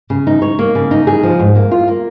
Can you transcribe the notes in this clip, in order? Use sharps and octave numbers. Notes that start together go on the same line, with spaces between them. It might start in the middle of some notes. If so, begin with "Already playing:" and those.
C#3
D#4
C#5
A#3
C#3
D#4
G#4
F3
G#2
A#3
F4
A#3